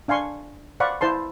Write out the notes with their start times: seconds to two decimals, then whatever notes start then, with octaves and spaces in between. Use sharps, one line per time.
0.08 D4 F5 G#5 C6 C#6
0.80 C5 D5 F5 F#5 B5 C#6
1.01 E4 C5 A5 C6